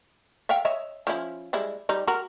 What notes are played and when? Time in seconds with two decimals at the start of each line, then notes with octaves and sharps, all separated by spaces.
0.49 E5 F5 G5
0.65 C#5 D#5 E5
1.07 F3 C#4 E4
1.53 G3 G#3 E4
1.89 G3 D#4
2.08 F#4 A#4